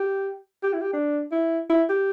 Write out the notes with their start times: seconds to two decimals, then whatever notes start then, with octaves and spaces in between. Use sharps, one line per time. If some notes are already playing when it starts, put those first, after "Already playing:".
Already playing: G4
0.63 G4
0.73 E4
0.81 G4
0.93 D4
1.32 E4
1.70 E4
1.89 G4